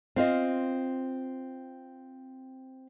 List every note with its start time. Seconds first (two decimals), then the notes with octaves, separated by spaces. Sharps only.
0.16 C4 F4 D#5